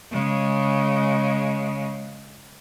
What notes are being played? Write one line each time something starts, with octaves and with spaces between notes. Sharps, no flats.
C#3 G#3